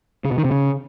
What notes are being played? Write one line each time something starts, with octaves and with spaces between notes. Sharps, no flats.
C#3
B2
D#3
C3
C#3